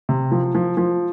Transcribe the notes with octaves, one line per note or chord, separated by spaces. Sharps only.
C3
F3
F3
F3